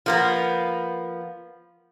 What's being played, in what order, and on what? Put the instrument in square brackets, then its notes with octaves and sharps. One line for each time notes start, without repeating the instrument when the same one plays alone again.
[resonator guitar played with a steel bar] F3 A#3 B3